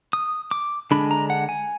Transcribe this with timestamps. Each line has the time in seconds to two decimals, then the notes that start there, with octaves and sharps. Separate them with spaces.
0.13 D#6
0.51 D6
0.91 D3 G#3 D4 B5
1.11 A#5
1.30 F#5
1.49 G#5